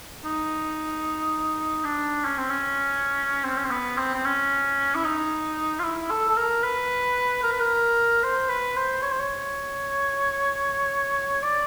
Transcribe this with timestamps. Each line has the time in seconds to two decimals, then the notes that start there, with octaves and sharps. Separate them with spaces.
0.25 D#4
1.84 D4
2.25 C#4
2.38 C4
2.50 C#4
3.44 C4
3.57 C#4
3.64 C4
3.71 B3
3.98 C4
4.14 C4
4.25 C#4
4.95 E4
5.05 D#4
5.79 F4
5.83 E4
6.11 A4
6.29 A4
6.37 A#4
6.63 B4
7.43 A#4
7.53 B4
7.60 A#4
8.23 C5
8.49 B4
8.77 C5
9.02 C#5
9.12 C5
9.20 C#5
11.43 D5